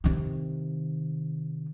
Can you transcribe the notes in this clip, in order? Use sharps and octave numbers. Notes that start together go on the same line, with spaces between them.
C3 D#3